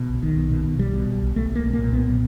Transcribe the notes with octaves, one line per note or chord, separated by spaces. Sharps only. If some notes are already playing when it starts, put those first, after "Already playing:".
Already playing: B2
B1
B1 D#3
B2
B2
B2
B1 G3
B2
B1
B1
B1 A3
B1
A#3
B1
A#2 A#3
B1 B3
A#2